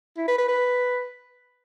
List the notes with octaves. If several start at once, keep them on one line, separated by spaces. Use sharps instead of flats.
E4
B4
B4
B4